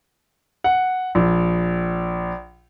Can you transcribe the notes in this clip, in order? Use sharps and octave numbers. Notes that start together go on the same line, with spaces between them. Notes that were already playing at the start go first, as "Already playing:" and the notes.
F#5
A#1